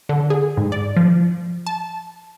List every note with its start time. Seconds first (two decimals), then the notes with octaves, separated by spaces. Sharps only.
0.09 D3
0.30 G#4
0.57 G#2
0.72 D5
0.96 F3
1.67 A5